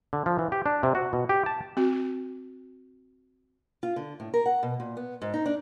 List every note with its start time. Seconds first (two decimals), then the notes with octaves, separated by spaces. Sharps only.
0.13 D3
0.26 F3
0.39 E3
0.52 G4
0.66 D4
0.83 C3
0.95 F#4
1.13 B2
1.29 G4
1.46 A5
1.77 C4 F#4
3.83 F4
3.96 D3
4.20 A2
4.34 A#4
4.46 F#5
4.63 B2
4.80 A#2
4.97 B3
5.22 G#2
5.34 D#4
5.46 D4